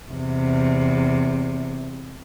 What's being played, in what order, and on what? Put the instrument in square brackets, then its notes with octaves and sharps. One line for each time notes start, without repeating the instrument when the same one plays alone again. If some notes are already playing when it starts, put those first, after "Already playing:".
[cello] E2 C3